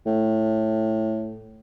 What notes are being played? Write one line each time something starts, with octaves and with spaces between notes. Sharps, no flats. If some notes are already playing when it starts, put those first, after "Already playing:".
A2